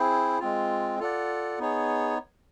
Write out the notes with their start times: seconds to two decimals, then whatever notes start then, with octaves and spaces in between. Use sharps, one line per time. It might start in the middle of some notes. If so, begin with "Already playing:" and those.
Already playing: C4 E4 G#4 C5
0.40 G#3 C4 F4
0.99 F4 A4 D5 F#5
1.59 B3 D#4 G#4 C#5